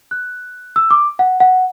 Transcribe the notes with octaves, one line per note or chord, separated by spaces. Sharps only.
F#6
E6
D6
F#5
F#5